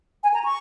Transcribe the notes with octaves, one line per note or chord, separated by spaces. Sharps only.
G#5
A#5
C#6